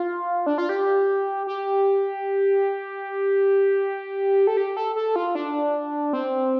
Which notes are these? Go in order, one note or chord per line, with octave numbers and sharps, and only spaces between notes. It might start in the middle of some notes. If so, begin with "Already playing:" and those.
Already playing: F4
D4
F4
G4
G4
A4
G4
A4
A4
F4
D4
C4